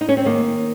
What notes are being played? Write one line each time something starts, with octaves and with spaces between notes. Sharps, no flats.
D#4
C#4
C4
D#3 A#3